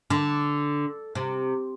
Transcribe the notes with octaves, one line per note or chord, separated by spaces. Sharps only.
D3
C3